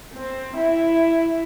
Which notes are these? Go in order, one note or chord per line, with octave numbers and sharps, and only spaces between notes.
C4
E4